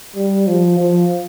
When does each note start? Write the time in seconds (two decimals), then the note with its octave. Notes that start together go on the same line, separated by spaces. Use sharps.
0.16 G3
0.47 F3
0.79 F3